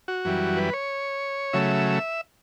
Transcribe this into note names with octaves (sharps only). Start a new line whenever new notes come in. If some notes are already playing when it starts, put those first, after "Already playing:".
F#4
F#2 E3 G3
B4
C#5
C#3 F#3 A3 E5